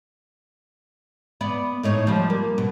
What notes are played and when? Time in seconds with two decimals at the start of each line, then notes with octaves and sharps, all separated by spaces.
1.41 B3 D5
1.83 A2 D#4 C#5
2.07 F3 G3
2.30 A#3
2.58 B2